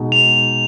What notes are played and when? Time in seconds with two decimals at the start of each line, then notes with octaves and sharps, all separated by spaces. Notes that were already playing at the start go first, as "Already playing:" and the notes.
Already playing: B2 G#3 D#4
0.12 F7